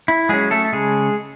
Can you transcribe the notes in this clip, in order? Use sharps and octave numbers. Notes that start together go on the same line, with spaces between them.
E4
F#3 G#3 C#4 G#4
A3 A4
C#3 G#3 G#4